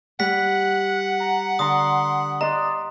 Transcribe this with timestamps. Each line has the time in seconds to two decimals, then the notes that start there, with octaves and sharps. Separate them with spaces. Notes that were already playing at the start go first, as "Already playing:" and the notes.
0.20 G3 F#5 F#6 B6
1.20 A#5
1.59 D3 A#5 C6 D#6
2.41 D5 D#5 A#5 C6 F#6